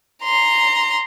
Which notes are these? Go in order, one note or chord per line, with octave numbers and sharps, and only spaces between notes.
A#5 C6